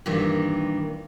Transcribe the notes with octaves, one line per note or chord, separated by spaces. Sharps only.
G2 A#2 D#3 E3 G3